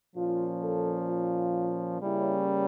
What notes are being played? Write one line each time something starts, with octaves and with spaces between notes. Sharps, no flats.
A#2 F3 C#4 F4
A4
F4
C#3 G3 A#3 C#4 E4